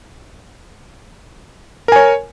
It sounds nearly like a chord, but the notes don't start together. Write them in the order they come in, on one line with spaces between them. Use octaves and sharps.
A#4 G#5 C#5